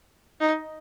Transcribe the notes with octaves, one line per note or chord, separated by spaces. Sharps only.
D#4